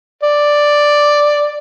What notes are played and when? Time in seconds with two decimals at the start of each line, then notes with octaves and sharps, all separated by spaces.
0.23 D5